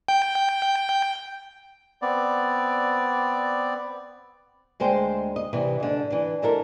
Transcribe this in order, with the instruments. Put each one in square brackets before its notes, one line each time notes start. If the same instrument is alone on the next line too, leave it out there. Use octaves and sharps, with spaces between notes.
[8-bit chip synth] G5
[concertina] B3 C4 D5
[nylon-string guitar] D2 G#3 C5 G5
D#5
C3 E3 G3
G#2 D3
E3 D4
G#2 D3 E4 A4 A#4